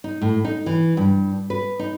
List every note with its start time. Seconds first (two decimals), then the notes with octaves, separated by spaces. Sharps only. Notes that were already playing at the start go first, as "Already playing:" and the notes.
0.04 D#4
0.21 A2
0.45 D#4
0.66 E3
0.97 G2
1.50 B4
1.79 D#4